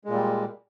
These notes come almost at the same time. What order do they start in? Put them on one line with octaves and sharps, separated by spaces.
G#3 A#2 G3